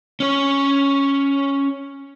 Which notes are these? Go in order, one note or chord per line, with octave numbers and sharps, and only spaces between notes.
C#4 C#5